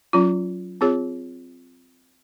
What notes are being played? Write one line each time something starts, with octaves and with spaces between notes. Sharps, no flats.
F#3 C#4 F4
C4 F4 G#4 C#5